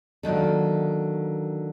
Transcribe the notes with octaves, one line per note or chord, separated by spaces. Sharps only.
D3 D#3 F#3 A#3